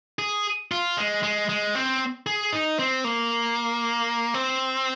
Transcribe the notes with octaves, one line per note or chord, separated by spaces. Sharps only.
G#4
F4
G#3
G#3
G#3
C4
G#4
D#4
C4
A#3
C4